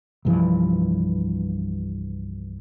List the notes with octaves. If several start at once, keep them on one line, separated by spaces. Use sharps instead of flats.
C2 G2 E3 F3